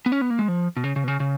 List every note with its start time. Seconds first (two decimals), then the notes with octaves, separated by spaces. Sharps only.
0.06 B3
0.12 C#4
0.21 B3
0.30 A#3
0.39 G#3
0.48 F3
0.77 B2
0.84 C#3
0.96 C#3
1.04 B2
1.08 C#3
1.20 C#3